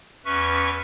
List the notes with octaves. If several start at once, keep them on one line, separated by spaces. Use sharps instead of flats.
E2 C#4 B4 E5 C#6